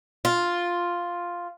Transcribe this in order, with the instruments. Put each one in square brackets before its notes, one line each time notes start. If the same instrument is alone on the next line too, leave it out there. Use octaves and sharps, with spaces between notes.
[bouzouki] F4